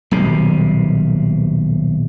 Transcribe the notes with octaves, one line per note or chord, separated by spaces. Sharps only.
D#1 B1 C3